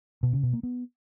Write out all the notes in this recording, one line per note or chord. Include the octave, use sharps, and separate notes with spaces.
B2
C#3
B2
A#3
B3